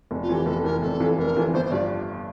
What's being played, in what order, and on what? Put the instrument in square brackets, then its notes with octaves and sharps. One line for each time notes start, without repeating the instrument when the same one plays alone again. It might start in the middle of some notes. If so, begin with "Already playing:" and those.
[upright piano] F1
[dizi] F4
[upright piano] F2 E3
[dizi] G4
[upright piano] F1 [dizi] A4
[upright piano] F2 E3 [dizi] A#4
[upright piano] F1 [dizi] A4
[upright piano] F2 E3
[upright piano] F1 [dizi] A#4
[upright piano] F2 E3
[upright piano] G1 [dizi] C5
[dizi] C5
[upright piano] G2 F3 [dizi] D5